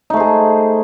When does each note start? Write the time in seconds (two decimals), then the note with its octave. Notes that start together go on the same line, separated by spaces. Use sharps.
0.10 D#4
0.13 A3
0.17 C5
0.20 G#4